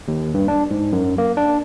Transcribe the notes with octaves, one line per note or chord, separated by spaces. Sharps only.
D#2
G2
D4
G#2
F#2
A#3
D4